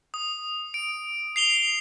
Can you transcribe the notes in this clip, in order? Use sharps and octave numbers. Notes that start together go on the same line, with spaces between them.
D#6
D7
C7 F7 G7